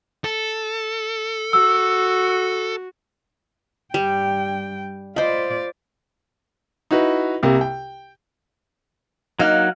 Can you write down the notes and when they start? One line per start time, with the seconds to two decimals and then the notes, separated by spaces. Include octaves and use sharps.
0.24 A4
1.53 F#4 E6
3.94 G2 G3 G5
5.16 F4 C5 D5 D#5 B5
6.91 D#4 E4 F#4 B4
7.43 C2 C3 A#3
7.61 G5
9.39 F#3 A#3 D#4 F5 F#5